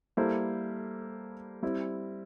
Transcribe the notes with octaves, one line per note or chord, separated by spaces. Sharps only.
G3 A#3 E4 A4 C5
G3 C4 E4